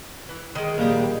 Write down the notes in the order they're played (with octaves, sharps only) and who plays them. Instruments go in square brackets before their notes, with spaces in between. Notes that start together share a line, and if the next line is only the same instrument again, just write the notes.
[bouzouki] E3
D#3 G#3
[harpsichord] A#1 G3